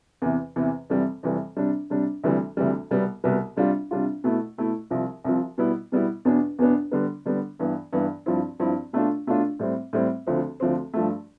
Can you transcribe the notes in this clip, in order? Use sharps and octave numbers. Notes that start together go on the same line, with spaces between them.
E2 C3 E3
E2 C3 E3
F2 C3 E3 G3
F2 C3 E3 G3
C3 G3 D4
C3 G3 D4
D2 C3 E3 G3
D2 C3 E3 G3
C2 B2 G3 B3
C2 B2 G3 B3
C3 G3 D4 F4
C3 G3 D4 F4
B2 A3 E4
B2 A3 E4
C2 C3 F3
C2 C3 F3
B2 G3 B3 E4
B2 G3 B3 E4
E2 B2 B3 D4
E2 B2 B3 D4
D3 G3 B3
D3 G3 B3
G2 E3 B3
G2 E3 B3
G2 F3 C4 E4
G2 F3 C4 E4
B2 A3 D4 F4
B2 A3 D4 F4
A2 G3 C4
A2 G3 C4
D2 D3 F3 C4
D2 D3 F3 C4
G2 F3 A3